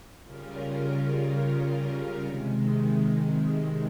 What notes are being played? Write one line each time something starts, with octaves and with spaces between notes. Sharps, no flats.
C#3 G3 C#4 F4 A#4
C3 D#3 G#3